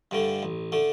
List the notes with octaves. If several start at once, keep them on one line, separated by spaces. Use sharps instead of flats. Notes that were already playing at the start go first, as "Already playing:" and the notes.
G2 D3 A3
A1
D3 A3